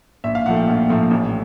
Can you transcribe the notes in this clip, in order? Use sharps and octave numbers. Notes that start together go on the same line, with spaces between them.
A#1 E5
F5
A#2 F3 A3 F#5
G5
A#1
A#2 F3 A3
A1